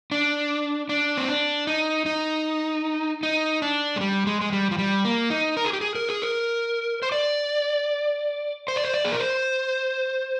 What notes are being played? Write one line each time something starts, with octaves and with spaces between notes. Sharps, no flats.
D4
D4
C4
D4
D#4
D#4
D#4
D4
G#3
G3
G#3
G#3
G3
F3
G3
A#3
D#4
A#4
G#4
G4
G#4
A#4
G#4
A#4
C5
D5
C5
D5
C5
D5
G#4
A#4
C5